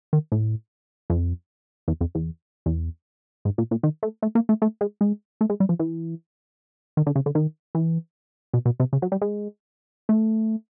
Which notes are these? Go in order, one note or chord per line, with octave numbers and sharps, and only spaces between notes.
D#3
A2
F2
E2
F2
E2
E2
G#2
A#2
A#2
D#3
A3
A3
A#3
A3
A3
G#3
G#3
A3
G#3
G3
F3
E3
D#3
D3
C#3
D3
D#3
E3
B2
B2
C3
C#3
F#3
G3
G#3
A3